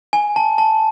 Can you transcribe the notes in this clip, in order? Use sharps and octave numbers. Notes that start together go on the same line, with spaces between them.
G#5
A5
A5